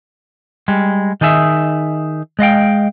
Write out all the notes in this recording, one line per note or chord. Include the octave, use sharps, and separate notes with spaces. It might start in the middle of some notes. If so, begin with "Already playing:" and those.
G3 G#3
D#3 D#4 G#4 E5
G#3 D#5 F5 G5